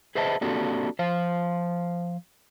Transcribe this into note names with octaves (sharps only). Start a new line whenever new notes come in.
G#4 B4 C5 D#5 E5 A5
A#3 C4 D4 F#4 G4 A4
F3 C5 F5